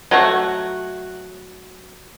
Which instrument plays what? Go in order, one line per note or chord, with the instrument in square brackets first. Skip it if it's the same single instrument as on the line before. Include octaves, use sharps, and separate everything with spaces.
[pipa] F#3 A3 F#4